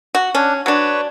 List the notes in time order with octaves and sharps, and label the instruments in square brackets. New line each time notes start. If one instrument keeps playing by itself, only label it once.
[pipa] F#4
[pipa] C#4 [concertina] D4
[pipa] F#3 D4 [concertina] B4 C#5